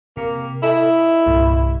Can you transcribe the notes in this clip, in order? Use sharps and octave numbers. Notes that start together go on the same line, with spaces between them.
C3 A#3
E4 A4 D#5 E5
C2 G2 A#2